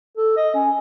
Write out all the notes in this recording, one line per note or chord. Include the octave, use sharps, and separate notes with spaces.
A4
D#5
C#4